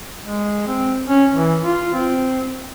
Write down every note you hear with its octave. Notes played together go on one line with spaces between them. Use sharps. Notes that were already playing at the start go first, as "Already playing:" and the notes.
G#3
C4
C#4
E3
F4
C4